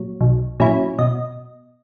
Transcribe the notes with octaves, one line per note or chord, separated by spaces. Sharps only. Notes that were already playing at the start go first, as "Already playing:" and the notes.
Already playing: A#2 F#3
B1
A#2 F#3 C#4 E4
B2 D#5